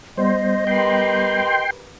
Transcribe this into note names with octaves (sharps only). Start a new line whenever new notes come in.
G3 B3 C5 D#5
G4 A#4 B4 G5 C6